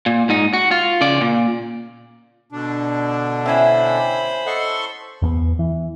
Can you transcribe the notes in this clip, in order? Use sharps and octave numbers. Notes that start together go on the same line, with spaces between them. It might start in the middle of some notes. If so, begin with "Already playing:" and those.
A#2
G#2 D#4
F#4
F4
C#3 D5
A#2
B2 D3 D4
C#4 E4 C5 E5 G5 G#5 B5
A4 D#5 F#5 C6 C#6
E2 A#3 B3
E3